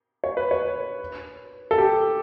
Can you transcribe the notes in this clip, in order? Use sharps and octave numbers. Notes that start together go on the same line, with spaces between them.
C#5
B4
C#5
A4
G4